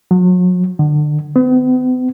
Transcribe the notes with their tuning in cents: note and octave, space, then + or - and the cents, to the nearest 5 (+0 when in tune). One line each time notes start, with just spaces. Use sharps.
F#3 -35
D3 +30
B3 +45